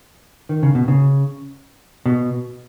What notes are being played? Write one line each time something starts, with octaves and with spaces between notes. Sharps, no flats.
D#3
C#3
B2
C#3
B2